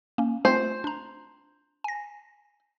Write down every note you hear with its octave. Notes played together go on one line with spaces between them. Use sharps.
A#3 C#4
A3 C4 F4 C5
D4 A#5
G#5 A#6